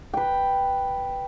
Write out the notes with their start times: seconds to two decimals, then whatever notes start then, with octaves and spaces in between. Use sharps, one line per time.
0.14 B4 G5